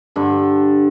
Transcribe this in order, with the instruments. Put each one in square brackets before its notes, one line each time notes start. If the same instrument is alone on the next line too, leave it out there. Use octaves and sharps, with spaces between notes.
[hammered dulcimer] G2 D3 A4